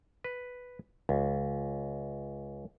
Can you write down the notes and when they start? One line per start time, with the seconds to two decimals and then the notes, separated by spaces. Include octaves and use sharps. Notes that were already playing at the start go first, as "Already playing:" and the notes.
0.24 B4
1.09 C#2